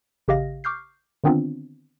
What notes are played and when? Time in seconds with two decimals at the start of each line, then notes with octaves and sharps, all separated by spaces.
0.28 A1 C#3 G4 D#5 F5 A#6
0.64 C#6 D6 F6 G6 C7
1.24 D3 D#3 B3 C4 D4 F4